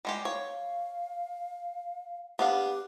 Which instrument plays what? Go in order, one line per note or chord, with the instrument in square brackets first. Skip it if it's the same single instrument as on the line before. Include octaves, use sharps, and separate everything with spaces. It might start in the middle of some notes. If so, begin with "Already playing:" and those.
[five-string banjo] G3 G#3 G4
[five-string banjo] C#5 [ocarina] F5
[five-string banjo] B3 D4 F5 [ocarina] G4